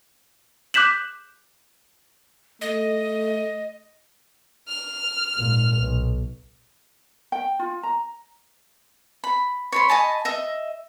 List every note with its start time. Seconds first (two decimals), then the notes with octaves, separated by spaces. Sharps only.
0.74 D6 F#6 G6 B6 E7 F#7
2.61 A3 D#5
4.68 F6
5.34 G#1 A#2
5.76 B1
7.32 G5
7.59 F4
7.83 A#5
9.24 B5
9.72 C#5 B5 C6
9.89 D#5 G#5 A5 B5
10.25 D#5 E5